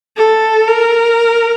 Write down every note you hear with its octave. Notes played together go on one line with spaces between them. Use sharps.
A4
A#4